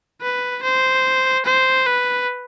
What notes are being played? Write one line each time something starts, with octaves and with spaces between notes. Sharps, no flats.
B4
C5
C5
B4